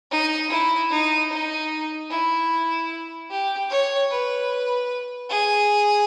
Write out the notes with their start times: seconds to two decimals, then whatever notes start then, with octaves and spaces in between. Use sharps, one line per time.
0.11 D#4
0.51 E4
0.91 D#4
1.31 D#4
2.11 E4
3.31 G4
3.70 C#5
4.10 B4
5.30 G#4